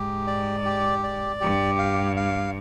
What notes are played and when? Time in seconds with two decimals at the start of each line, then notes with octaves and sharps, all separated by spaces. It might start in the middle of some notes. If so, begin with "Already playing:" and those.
Already playing: G#2 G4
0.27 D5
0.65 G4
1.03 D5
1.41 G2 G4
1.78 F5
2.16 F5